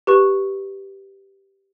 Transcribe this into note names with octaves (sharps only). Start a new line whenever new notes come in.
G4 B4 C#6